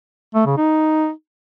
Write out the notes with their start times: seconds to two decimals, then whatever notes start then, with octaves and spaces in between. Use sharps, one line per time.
0.35 A3
0.46 C#3
0.57 D#4